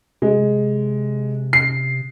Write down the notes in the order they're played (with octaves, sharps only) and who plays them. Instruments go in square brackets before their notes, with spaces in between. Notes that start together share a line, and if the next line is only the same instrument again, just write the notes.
[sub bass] C3 [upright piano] G#3
[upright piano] C7